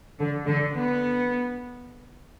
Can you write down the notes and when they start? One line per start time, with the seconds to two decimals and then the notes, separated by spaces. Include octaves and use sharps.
0.19 D3
0.47 D3
0.75 B3